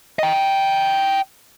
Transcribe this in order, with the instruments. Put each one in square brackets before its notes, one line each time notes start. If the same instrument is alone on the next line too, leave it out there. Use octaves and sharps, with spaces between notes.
[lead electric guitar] D#5 G5